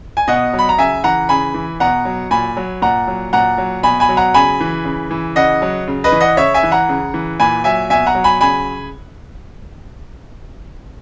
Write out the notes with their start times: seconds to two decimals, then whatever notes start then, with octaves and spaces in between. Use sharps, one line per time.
0.17 G#5
0.28 B2 D#5 F#5
0.53 F#3
0.59 B5
0.69 A#5
0.78 C#3 E5 G#5
1.04 E3 F#5 A#5
1.29 C#3 G#5 B5
1.54 E3
1.80 B2 F#5 A#5
2.05 F#3
2.31 A#2 G#5 B5
2.57 F#3
2.82 A#2 F#5 A#5
3.08 F#3
3.33 A#2 F#5 A#5
3.58 F#3
3.83 B2 G#5 B5
4.00 G#5 B5
4.09 F#3
4.17 F#5 A#5
4.34 C#3 G#5 B5
4.60 E3
4.85 C#3
5.11 E3
5.36 C#3 D#5 F#5
5.62 F#3
5.88 C#3
6.04 B4 D#5
6.12 E3
6.21 D#5 F#5
6.37 C#3 C#5 E5
6.54 E5 G#5
6.63 E3
6.72 F#5 A#5
6.89 C#3
7.14 E3
7.40 A#2 G#5 B5
7.64 F#3 E5 G#5
7.90 B2 E5 G#5
8.07 F#5 A#5
8.15 F#3
8.24 G#5 B5
8.41 C#3 G#5 B5